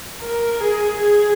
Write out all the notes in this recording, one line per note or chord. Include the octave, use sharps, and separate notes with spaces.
A#4
G#4
G#4